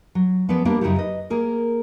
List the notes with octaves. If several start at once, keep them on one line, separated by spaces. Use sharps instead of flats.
F#3
F3 B3 C#4 G#4 B4 D5
G3 A#3 B3 D4 G4
F#2 C#3 D#4 E4 F#4 G4
B4 D#5
A#3 G#4 A#4